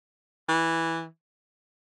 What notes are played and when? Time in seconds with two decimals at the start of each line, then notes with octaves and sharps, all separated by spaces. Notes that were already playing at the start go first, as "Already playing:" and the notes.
0.49 E3